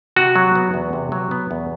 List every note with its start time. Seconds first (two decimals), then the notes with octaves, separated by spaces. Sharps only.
0.16 C3 F#4
0.36 F#3
0.55 B3
0.74 E2
0.93 C3
1.12 F#3
1.31 B3
1.51 E2